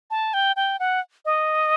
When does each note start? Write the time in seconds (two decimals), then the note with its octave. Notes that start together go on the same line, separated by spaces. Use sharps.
0.11 A5
0.34 G5
0.56 G5
0.80 F#5
1.25 D#5